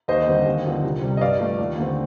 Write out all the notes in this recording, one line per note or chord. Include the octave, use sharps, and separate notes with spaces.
D#2 C5 D#5
D3 G3 C4
D#2
D3 F3 C4
C2
C3 G3
D#5
G2 D5 F5
F3 A3
D#2
D3 A3 C4